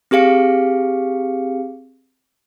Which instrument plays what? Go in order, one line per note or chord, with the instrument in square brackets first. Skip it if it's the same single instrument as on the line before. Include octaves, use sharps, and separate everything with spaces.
[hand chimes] C4 G4 G#4 F5 C#7